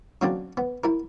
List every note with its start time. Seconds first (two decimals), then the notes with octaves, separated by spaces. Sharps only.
0.21 C#3 F#3 A#3 C4 D4
0.57 B3
0.84 E4 A#4